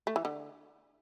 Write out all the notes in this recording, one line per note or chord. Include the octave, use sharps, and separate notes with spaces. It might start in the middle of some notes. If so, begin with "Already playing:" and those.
A3
E3
D3